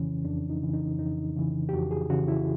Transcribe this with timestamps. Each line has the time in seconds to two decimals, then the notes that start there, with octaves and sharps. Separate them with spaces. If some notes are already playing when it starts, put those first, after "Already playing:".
Already playing: F2 C#3 E3 C#4
0.25 F2 D4
0.50 D#4
0.62 C#3 E3
0.73 D#4
0.99 F2 D#4
1.36 C#3 E3
1.69 G4
1.73 F2 F#4
1.91 G#4
2.10 C#3 E3 F#4
2.28 E4